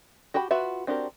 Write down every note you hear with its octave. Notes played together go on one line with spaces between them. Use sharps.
F#4 G4 G5 B5
F4 F#4 B4 E5
C4 D4 F#4 G4 A#4